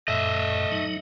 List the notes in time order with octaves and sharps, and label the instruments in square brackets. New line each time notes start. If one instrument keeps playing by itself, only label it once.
[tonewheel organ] F#2 A#2 [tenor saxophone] A3 [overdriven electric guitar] D#5 E5
[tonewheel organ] F#3 D#4